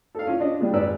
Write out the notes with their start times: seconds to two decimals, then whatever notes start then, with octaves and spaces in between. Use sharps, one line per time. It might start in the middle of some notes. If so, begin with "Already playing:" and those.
0.15 A4 F5
0.27 C#4 F4
0.40 C#4 D4 F4 C#5 D#5
0.60 G3 B3 D4 F4 G#4
0.73 G#1 G#3 D#4 B4 D5 E6